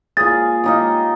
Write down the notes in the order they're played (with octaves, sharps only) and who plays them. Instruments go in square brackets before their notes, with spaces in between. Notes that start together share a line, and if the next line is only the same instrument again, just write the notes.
[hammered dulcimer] A#2 G#4 [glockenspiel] A6
[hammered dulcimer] A#3 D#4 G4